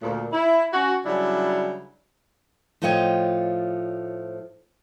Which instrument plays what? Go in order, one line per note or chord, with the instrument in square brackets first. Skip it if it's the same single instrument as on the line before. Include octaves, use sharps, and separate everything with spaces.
[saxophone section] D2 A#2
E4
C#4 F#4
C#3 F#3 G3 D4 E4
[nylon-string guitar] A2 F3 F4 C#5 D#5 G5